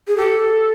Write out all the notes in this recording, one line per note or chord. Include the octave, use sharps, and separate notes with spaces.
G#4
G4 A4